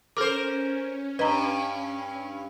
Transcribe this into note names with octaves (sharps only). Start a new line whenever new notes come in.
C#4 A4 A#4 C5 D6
G2 B4 D#5 A#5